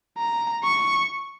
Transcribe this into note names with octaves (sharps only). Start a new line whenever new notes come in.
A#5
C#6